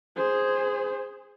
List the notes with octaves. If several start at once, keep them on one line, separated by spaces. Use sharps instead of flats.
G#4 C5